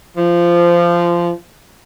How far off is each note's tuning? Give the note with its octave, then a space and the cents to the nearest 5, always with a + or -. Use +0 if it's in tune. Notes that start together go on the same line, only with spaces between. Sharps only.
F3 -15